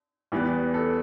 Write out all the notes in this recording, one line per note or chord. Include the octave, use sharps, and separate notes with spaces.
E2 E3 G3 B3
A4